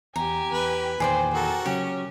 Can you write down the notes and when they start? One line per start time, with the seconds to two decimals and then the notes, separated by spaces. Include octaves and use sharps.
0.16 E2 G4 G#5 A#5
0.52 E2 B4
1.00 E2 A#2 D#3 G#4 C5 D5 G5
1.34 F#4 A4 A#4
1.66 C#3 F#3 C#4 G4